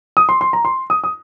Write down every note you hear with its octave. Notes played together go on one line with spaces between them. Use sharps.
D#6
C6
C6
A#5
C6
D#6
D#6